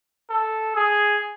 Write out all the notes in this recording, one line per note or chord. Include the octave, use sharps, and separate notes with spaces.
A4
G#4